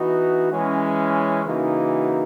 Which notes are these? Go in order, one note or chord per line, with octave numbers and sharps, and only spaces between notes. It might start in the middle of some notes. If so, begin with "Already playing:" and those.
Already playing: E3 B3 D#4 F#4
E3 G#3 C#4
C#3 E3 A#3 D#4 F#4